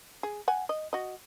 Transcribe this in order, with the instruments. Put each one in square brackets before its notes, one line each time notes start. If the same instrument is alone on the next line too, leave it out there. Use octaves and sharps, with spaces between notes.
[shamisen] G#4
F#5 G#5
D#5
F#4 D#5